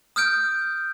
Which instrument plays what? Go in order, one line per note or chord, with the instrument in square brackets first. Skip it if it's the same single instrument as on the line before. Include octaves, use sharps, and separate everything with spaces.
[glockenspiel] D#6 F6 G6 D7